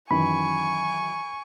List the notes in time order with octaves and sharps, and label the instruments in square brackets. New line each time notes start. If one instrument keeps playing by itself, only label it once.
[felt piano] F#2 D#3 E3 [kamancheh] G#5 C#6 [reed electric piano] B5